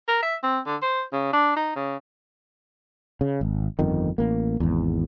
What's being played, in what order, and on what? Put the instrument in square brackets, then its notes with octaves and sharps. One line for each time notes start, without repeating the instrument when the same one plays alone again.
[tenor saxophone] A#4
E5
C4
D3
C5
C#3
D4
D#4
C#3
[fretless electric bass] C#3
G#1
G1 F2 D#3
A1 A#3
G#1 E2